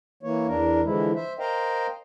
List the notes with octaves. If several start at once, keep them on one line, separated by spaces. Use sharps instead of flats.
E3 A#3 C#5
E2 D4 A#4
D3 E3 F3 G#3 E4
C5 E5
A#4 C5 D#5 F5 G5